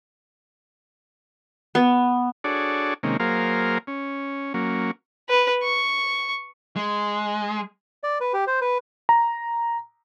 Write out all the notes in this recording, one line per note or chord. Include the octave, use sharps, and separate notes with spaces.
B3
D4 F#4 G#4 A4 C#5 D5
C3 D#3 G#3 A#3 C#4
F#3 A#3 G#4 A#4 C5 F5
C#4
F#3 A#3 C#4
B4
C#6
G#3
D5
B4
G4
C5
B4
A#5